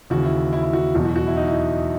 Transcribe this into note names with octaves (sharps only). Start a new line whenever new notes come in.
D#2 C#3 E3 F#4
E4
E4
E4
F#4
E2 B2 F#3 F#4
F#4
F#4
E4
D#4
E4